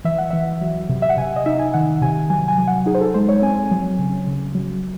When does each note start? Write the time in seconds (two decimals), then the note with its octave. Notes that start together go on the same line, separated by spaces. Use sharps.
0.05 E3 E5
0.18 F#5
0.30 E3 E5
0.61 F#3
0.89 C3
1.02 E5
1.09 F#5
1.17 C3 G#5
1.36 D#5
1.46 D#4 E5
1.59 G#5
1.74 D#3 F#5
2.02 C3 G#5
2.30 F#3 G#5
2.48 G#5
2.58 F#3
2.68 F#5
2.86 D#4 G#4
2.95 C5
3.01 A4
3.14 G#3 C5
3.29 C#5
3.42 C4 G#5
3.71 F#3
3.99 C#3
4.27 C#3
4.55 F#3